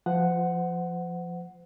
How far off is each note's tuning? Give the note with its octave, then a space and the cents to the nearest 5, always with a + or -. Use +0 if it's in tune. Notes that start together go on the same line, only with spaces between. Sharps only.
F3 +0 C5 -35 F#5 +0